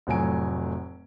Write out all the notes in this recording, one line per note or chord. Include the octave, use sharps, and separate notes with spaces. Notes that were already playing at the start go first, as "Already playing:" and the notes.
F1 A2 F#3 G#5 D7